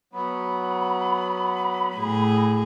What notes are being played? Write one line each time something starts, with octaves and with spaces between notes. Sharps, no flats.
F#3 B3 B5
A2 G#4